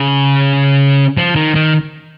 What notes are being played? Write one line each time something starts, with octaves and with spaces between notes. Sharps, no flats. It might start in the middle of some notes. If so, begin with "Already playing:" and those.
Already playing: C#3
F3
D#3
D#3